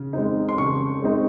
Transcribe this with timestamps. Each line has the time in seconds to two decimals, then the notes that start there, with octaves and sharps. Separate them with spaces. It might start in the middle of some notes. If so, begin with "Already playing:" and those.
Already playing: C#3
0.13 G#3 C4 D#4
0.49 C6
0.58 C#3 C#6
1.02 G#3 C4 D#4